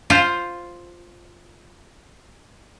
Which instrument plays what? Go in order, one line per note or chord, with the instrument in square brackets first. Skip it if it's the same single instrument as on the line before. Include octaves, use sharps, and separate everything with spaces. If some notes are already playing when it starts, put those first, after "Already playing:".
[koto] F4 C5